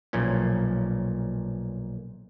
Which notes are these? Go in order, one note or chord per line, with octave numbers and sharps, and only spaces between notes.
B1 A#2 F3 C#4